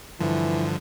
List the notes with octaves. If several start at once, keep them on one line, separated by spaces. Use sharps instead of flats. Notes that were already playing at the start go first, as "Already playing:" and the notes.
G2 D3 E3 F3